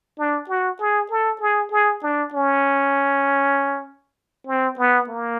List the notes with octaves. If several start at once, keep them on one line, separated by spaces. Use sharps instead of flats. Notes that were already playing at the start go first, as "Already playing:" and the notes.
D4
F#4
G#4
A4
G#4
G#4
D4
C#4
C4
B3
A#3